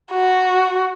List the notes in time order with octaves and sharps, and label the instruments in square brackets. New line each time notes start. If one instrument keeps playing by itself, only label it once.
[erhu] F#4